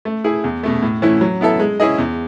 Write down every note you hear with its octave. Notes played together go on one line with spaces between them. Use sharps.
A3
E4 G#4
E2
B2 A3
A2
E3 A3 C#4 E4
F#3
B3 E4 A4 E5
G#3
C#4 E4 G#4 D#5
E2